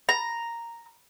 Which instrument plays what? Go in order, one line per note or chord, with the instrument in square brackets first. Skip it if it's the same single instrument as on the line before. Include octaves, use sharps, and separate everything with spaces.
[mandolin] A#5